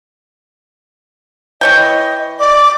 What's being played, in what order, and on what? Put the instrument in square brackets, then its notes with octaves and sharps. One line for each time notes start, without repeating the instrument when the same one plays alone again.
[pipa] E3 C#5 G5 [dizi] D#5
[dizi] D5 [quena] D6